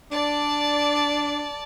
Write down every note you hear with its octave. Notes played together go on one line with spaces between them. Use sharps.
D4 D5 A5